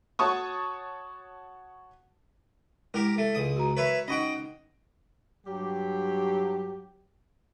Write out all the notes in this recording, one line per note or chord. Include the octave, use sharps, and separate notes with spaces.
F#4 C#5 A5 C#6 D#6
G#3 E4 G4 A#4 D6
A3
C#2 D#6
F#4 A#5
A#4 B4 C#5 E5
C#4 D#4 D#5 F#5 G5
G2 F#3 G4